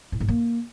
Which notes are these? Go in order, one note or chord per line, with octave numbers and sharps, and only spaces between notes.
A2
G#2
A#3